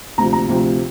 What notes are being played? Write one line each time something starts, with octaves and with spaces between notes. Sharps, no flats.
D2 C3 F3 A#5
A#5
D2 C3 F3